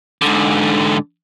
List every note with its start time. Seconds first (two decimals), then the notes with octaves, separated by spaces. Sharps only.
0.22 G#2 D3